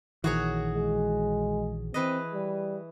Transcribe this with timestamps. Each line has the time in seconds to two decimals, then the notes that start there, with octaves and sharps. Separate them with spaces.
0.24 A#1 D#3 E3 F#4 G#4 C#5
0.75 G#3
1.94 E3 C4 B4 D#5
2.33 G3